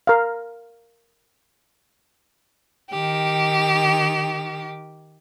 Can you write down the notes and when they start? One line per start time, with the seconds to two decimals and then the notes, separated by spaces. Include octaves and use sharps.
0.07 A#4 F5
2.91 D#3 G4